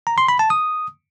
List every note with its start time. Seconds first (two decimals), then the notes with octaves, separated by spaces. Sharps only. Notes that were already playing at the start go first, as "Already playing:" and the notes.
0.07 A#5
0.18 C6
0.28 B5
0.39 A5
0.50 D#6